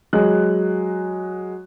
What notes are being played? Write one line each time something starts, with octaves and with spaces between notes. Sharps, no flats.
F#3 G#3 F#6